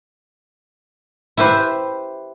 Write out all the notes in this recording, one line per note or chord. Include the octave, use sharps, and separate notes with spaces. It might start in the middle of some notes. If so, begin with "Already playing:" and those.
E4 G4 B4 C5